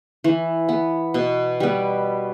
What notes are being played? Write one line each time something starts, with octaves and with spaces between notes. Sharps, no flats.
E3
B3
B2
G3 B3